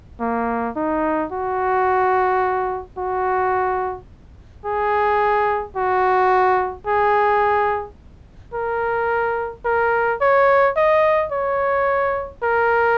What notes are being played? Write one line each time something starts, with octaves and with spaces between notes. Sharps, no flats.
A#3
D#4
F#4
F#4
G#4
F#4
G#4
A#4
A#4
C#5
D#5
C#5
A#4